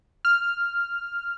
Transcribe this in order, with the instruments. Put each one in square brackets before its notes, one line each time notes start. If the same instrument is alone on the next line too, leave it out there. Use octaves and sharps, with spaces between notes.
[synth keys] F6